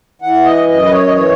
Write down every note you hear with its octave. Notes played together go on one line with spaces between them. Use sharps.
E3 F#5
D#5
F#2 D#5
B4
C#5
D#5
E3 C#5